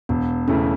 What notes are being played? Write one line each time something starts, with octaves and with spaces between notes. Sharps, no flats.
E1 B3
E2 C#3 A3 C#4 E4